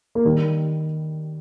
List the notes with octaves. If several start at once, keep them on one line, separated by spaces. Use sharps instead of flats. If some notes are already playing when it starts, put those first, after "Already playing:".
A#3
D#3 G3